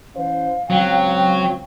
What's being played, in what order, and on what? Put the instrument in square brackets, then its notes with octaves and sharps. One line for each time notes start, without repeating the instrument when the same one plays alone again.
[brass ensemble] E3 C#4 C5 [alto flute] F5
[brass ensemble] C#2 C4 G5 [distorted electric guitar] F#3